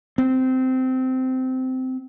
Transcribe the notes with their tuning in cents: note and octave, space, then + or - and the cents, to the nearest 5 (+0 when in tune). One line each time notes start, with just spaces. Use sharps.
C4 -15